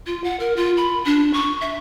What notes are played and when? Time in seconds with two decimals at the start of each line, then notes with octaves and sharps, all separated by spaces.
0.07 F4
0.24 F#5
0.39 A#4
0.56 F4
0.77 B5
1.06 D4
1.34 C#6
1.61 E5